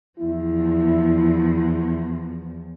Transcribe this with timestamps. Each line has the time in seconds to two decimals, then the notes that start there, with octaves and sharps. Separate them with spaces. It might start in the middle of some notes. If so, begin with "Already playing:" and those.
0.20 E2 F3 E4